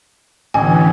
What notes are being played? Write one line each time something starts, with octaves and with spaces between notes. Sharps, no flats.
A1 D3 E3 B3 G#5